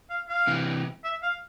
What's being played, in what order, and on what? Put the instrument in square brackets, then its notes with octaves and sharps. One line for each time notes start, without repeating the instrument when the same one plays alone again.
[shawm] F5
F5
[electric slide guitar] C3 E3
[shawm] E5
F5